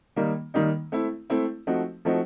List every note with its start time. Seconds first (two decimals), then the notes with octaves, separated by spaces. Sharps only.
0.16 D#3 G3 A#3 D#4
0.54 D#3 G3 A#3 D#4
0.92 A3 C4 E4
1.30 A3 C4 E4
1.67 F3 A3 C4 D#4 F#4
2.05 F3 A3 C4 D#4 F#4